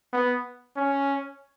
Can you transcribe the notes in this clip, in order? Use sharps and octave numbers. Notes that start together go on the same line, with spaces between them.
B3
C#4